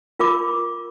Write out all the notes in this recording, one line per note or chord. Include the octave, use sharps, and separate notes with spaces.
F4 A#4 B5 D6